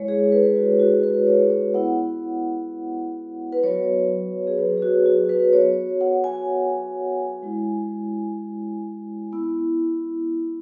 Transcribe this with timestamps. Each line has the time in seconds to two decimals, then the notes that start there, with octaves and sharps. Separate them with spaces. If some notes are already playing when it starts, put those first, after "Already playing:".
Already playing: G#3 E4 C#5
0.08 G#4
0.32 B4
0.56 F#4
0.79 F#4
1.03 B4
1.27 C#5
1.50 C#5
1.74 B3 E4 F#5
3.53 B4
3.63 F#3 B3 F#4 C#5
4.47 G#4
4.58 B4
4.78 G#4
4.82 F#4
5.06 F#4
5.29 B4
5.53 B3 F#4 C#5
6.01 F#5
6.24 G#5
7.43 G#3 E4
9.32 B3 E4